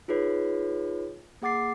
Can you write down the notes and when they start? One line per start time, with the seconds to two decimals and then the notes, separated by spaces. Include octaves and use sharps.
0.08 D#4 F4 G#4 B4 C#5
1.42 A#3 G#4 F#5 D6 A6 C7